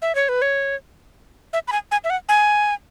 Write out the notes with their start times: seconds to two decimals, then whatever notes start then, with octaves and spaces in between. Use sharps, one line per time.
0.02 E5
0.15 C#5
0.29 B4
0.42 C#5
1.53 E5
1.68 B5
1.72 G#5
1.91 G#5
2.04 E5
2.10 F#5
2.29 G#5